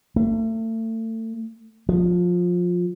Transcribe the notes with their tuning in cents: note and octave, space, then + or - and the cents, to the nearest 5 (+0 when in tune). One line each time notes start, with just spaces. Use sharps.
A3 +30
F3 +20